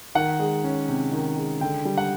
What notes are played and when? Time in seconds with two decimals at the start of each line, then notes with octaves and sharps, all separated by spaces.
0.15 D#3 F#5
0.39 G#3
0.64 C#4
0.88 C3
1.13 D#3
1.37 G#3
1.60 D3 G5
1.85 G3
1.98 F#5